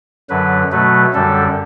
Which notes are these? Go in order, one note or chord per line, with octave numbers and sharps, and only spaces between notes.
F#2 D3 F#3 B4
B2 F#3 A3 B4
F#2 D3 G3 A4